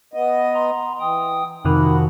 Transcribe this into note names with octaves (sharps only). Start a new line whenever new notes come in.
B3 D#5
A#5 C6
E3 G5 D#6
F2 C3 D#3 F3 D#4 F#4 A#4 B5